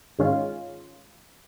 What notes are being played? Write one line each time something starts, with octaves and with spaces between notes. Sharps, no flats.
G#2 D#3 G#3 C#4 F4